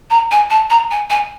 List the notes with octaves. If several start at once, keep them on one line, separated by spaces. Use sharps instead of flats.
A#5
G#5
A5
A#5
G#5
G#5